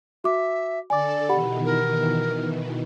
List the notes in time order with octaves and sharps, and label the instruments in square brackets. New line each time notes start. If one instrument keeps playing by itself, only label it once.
[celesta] F#4 D6 [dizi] E5
[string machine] D3 A4 [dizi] D5 [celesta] G#5 D6
[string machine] B2 D#3 E3 [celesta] G4 F#5 B5
[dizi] A#4